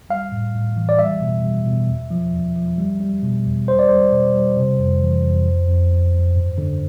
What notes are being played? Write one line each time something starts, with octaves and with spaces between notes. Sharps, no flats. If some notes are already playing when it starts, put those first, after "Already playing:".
G3 F5
A2
A2
E3
D5
G3 E5
B2
G3
B2
E2
F3
E2
F3
G3
G3
B2
E2
G3 C5
D5
G3 C5
B2
G3
C3
F2
E3
F2
F2
F2
F2
F2
G2
D3